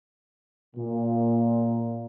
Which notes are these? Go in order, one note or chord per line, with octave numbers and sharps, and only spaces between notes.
A#2